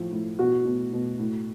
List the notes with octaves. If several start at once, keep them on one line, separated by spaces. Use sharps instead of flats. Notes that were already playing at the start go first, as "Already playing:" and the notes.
Already playing: A2 F3
A2
B2 F#4
B2
B2
A2